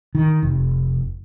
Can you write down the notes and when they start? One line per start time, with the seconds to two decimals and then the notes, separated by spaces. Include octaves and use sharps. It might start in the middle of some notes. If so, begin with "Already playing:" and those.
0.15 D#3
0.43 F1